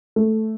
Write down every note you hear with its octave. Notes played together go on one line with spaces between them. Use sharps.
A3